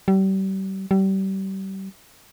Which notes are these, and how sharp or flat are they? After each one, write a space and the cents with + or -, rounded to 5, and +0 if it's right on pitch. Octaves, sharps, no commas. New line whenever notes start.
G3 -35
G3 -30